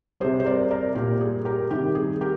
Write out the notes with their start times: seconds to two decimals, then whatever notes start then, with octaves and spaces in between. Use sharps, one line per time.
0.20 C3 G3 G#4 C5
0.40 C5
0.46 A#4 D5
0.70 A#4 D5
0.95 A#2 G3 G4 A#4
1.21 G#4
1.45 G4 A#4
1.71 C3 D#3 G3 G4
1.95 G#4
2.21 G4 A#4